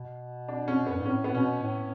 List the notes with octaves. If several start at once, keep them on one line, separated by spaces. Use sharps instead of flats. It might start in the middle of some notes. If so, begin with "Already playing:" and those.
Already playing: B2
D4
C#4
F#2 B3
G#2
A2 C#4
B3
B2 C#4
A2